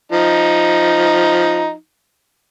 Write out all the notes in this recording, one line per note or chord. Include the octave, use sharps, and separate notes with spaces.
F3 D#4